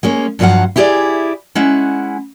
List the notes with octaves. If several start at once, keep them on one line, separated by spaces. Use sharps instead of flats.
G#3 A#3 C#4
G2 F3 F#3 A#4 F5 F#5
E4 G4 G#4 C5 D5
G#3 C#4 E4 F#5